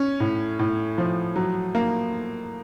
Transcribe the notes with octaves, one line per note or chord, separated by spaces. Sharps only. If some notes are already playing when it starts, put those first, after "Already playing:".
Already playing: C#4
A2
A2
F3
F#3
A#3